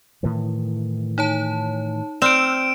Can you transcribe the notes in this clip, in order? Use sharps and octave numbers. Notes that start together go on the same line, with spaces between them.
A2 D#3 E3
D#4 C#5 A5
C4 D5 E6 F6 D7 E7